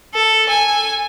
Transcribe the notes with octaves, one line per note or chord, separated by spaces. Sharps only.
A4
G#5